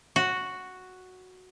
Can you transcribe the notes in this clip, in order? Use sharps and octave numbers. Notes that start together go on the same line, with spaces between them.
F#4